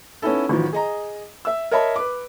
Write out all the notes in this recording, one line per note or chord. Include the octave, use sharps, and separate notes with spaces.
B3 C#4 D#4 E4 A4
A1 D#3 F3 F#3
G#4 D#5 A#5
E5 E6
A#4 C#5 D#5 E5 A5 B5
B4 D6